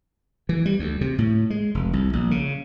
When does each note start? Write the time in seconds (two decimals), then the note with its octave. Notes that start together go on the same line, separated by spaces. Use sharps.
0.49 E3
0.66 G3
0.79 D2
1.01 C3
1.18 A2
1.50 G#3
1.75 F1
1.93 C2
2.13 A#1
2.31 C#3